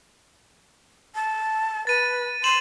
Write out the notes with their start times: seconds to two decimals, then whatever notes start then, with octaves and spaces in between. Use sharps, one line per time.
1.15 A5
1.87 B4 A6 D#7
2.44 C6 D#7 E7 F#7